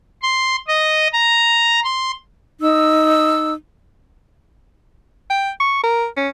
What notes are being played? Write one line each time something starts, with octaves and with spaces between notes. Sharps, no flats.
C6
D#5
A#5
C6
D#4 E6
G5
C#6
A#4
C#4